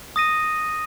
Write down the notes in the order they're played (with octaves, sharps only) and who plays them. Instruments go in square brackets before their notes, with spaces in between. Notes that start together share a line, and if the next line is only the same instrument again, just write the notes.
[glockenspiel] D#6 A#6 D#7